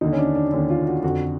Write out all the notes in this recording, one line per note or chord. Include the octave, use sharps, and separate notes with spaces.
D#2 D3 D#4
C#4
D4
D4
D#2 D3 C#4
F4
F#4
F2 D3 F#4